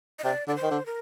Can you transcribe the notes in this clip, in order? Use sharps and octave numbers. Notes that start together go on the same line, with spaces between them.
D#5
C3 D5
D3 D5
C5
D#3
D3
A#4